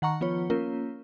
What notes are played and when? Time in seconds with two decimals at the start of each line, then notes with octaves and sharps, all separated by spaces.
0.02 D#3 F#5 A#5 C#6
0.21 F3 B3 F4 C#5
0.50 A#3 C#4 F4 A#4